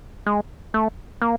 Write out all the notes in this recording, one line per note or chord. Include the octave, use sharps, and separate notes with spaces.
G#3
A3
A#3